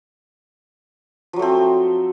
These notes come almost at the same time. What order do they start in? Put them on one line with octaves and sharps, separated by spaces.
F3 F#3 A3 C4